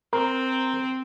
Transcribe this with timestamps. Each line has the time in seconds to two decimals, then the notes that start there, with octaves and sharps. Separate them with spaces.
0.13 C4 A#4